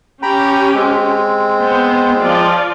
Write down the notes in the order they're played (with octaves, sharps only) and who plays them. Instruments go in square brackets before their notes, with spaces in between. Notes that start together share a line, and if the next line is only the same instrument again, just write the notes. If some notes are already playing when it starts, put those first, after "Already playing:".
[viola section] C#4 G4 [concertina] G5 A#5 B5
[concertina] G#3 C4
[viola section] B3 C5
F3 F4 D5